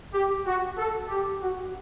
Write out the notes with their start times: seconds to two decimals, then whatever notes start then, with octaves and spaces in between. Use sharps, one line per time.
0.14 G4
0.46 F#4
0.77 A4
1.09 G4
1.41 F#4